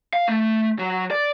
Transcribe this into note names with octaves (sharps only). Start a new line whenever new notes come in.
F5
A3
F#3
D5